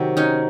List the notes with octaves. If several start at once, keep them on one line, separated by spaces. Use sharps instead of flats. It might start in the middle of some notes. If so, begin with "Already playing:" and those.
Already playing: C3 D#3 F#3 F#4
C#4 D#4